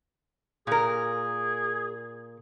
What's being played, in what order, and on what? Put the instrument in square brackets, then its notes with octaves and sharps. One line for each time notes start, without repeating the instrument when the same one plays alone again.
[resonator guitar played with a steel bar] A#2 A#4 [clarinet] G#4